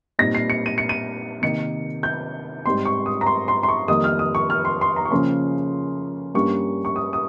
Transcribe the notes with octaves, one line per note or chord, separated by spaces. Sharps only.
A#2 G3 C4 D#4 A#6
C7
C#7
D#7
C#7
D#7
C3 D#3 A#3 D#4 C#7
G6
G#2 G3 C4 D#4 C6
C#6
D#6
A#5
C6
C6
C6
C#6
F2 D#3 G3 A#3 D#4 D#6
F6
D#6
C#6
F6
C6
C6
A#5
C#6
C#3 F3 A#3 C#4 C6
G2 G3 A#3 C#4 C#6
C#6
D#6
D#6